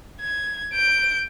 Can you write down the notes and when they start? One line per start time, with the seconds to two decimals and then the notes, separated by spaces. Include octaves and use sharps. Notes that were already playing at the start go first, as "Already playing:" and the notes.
0.21 G#6
0.73 G6 D7